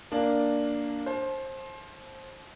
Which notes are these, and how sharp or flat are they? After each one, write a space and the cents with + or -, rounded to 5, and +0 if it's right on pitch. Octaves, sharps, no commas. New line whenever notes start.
A#3 +0 D4 +0
C5 +25 A5 -35